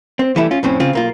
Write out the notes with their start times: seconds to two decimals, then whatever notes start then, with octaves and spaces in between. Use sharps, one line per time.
0.19 C4
0.36 E3 G3 A3 E4
0.51 C#4 F4
0.63 F2 A2 C4 C#4
0.80 C#3 C4 F4
0.93 B1 A#3 F4